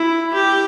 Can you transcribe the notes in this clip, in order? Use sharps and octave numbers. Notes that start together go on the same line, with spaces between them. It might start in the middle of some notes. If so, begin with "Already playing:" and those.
Already playing: E4
G4